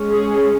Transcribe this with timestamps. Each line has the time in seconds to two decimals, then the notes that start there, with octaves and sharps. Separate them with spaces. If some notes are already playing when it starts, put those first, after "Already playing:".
Already playing: G#3 C#4
0.13 G#4